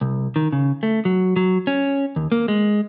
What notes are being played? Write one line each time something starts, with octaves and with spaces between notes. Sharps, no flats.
C2
D#3
C#3
A3
F#3
F#3
C#4
D#2
A#3
G#3